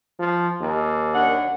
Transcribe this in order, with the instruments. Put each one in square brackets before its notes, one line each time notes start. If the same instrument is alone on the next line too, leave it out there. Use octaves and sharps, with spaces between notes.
[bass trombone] F3
D#2
[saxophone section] F#2 D4 F#5